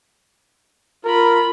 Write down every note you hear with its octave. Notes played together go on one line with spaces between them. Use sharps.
F4 A#4 B5